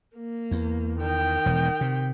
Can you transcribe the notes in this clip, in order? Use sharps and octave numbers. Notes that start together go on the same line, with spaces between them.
A#3
E2
D#3 G5
E1
C3